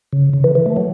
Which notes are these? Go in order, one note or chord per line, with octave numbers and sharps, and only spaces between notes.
C#3
C#3
E3
E3
A3
F#3